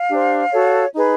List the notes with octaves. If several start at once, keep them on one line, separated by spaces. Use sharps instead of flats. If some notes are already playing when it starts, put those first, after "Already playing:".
Already playing: F5
D4 G4 C5
F#4 A4 C#5
D#4 G#4 B4